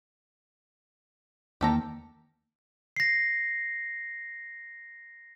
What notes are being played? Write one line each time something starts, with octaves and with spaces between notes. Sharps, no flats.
E2 D#3 A#3 G4 A4 A#5
A#6 C7